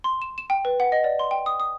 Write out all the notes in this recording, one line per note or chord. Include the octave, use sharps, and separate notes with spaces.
C6
E7
E7
G5
B4
F#5
D#5
D5
C6
G5
D#6
D#6